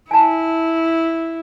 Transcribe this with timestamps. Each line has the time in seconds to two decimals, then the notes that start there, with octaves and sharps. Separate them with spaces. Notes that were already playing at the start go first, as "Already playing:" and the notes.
0.11 E4 G#5 A5